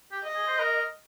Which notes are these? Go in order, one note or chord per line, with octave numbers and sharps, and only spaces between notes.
G4
D#5
G#4
C5
A#4